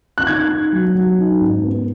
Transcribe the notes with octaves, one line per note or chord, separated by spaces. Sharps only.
F#6
D#4 G#6
D#4
F#3
F#3
D#4
G#2
B3